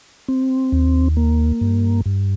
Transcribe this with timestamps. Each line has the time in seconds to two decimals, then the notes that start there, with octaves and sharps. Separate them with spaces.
0.28 C4
0.72 D#2
1.17 A#3
1.61 G2
2.06 G2